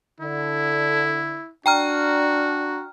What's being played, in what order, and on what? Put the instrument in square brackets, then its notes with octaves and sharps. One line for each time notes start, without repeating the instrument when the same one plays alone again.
[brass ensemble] D3 [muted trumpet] E4
[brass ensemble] D4 [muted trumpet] F#4 [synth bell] G5 A#5 F6